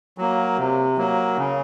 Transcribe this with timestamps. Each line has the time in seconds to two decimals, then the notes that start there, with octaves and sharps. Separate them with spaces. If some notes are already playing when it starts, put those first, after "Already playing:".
0.18 F#3 A#3
0.58 C3
0.98 F#3 A#3
1.37 C#3